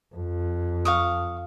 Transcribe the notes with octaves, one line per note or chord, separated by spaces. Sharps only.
F2
F5 C#6 D#6